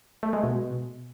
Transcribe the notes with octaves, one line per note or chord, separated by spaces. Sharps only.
A3
G#3
B2